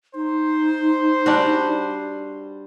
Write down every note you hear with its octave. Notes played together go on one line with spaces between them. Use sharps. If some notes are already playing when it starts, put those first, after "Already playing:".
D#4 C5
G3 D4 F#4